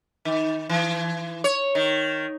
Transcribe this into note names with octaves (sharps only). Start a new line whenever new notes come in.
D#3
E3
C#5
D#3